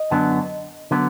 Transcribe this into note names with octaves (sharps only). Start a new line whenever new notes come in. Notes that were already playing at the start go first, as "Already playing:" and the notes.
Already playing: D#5
F#2 D3 F#3 B3 D4
D3 F#3 B3